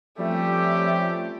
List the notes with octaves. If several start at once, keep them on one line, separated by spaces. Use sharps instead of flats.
F3 G3 A3 C4 C#4 G4